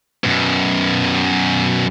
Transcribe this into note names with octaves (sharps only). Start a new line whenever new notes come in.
F#2 B2